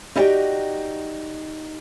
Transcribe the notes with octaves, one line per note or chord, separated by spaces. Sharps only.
D#4 E4 F#4 G4 D5 G5